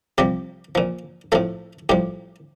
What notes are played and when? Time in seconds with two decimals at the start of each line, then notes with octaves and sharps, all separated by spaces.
0.18 C3 F3 G3 G4
0.75 A#2 F3
1.32 A2 F3 A3 A4
1.89 A2 F3 G3 G4